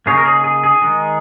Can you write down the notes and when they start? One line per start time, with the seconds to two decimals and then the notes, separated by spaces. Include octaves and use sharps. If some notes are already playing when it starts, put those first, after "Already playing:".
0.06 C#3 A#3 D#4 G#4 C#5
0.18 A#4
0.26 G#4
0.44 G#4
0.64 G#4
0.82 D#3 G#3 D#4